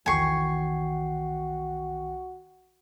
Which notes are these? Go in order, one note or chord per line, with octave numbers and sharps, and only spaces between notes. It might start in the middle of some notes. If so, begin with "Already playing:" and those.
B1 E2 D#3 F#4 G5 G#5 C#6 C7